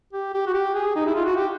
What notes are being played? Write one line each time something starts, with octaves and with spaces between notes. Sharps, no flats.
G4
G4
F#4
G4
G#4
D#4
E4
F4
F#4
G4